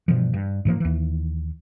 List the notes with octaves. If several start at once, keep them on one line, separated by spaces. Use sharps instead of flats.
G2 B2 E3 F3
G2
G#2 E3 F3 A#3
D#2 E3